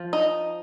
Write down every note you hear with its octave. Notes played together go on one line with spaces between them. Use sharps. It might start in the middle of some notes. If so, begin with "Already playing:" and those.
Already playing: F3
D#4